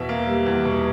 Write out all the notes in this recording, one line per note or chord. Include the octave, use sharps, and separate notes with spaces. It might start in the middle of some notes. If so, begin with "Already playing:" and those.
Already playing: E2 B2 E5
A#3
G3
E2
B2